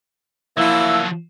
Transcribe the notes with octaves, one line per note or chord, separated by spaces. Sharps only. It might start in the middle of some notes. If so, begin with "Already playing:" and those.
F3 F#3 A#3 E4 E6